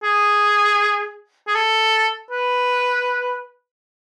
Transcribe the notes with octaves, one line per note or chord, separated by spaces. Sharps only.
G#4
G#4
A4
B4